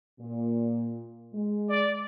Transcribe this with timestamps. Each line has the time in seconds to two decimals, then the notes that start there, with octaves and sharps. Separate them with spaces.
0.20 A#2
1.33 G#3
1.69 D5